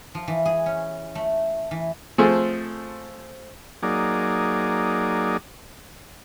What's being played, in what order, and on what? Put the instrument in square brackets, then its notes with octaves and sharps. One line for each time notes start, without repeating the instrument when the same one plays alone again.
[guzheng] F3
E3
G#4
C#4
A3
E3
[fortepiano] F3 A3 C4 G#4 A4
[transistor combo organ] F#3 A#3 D#4 G#4 D5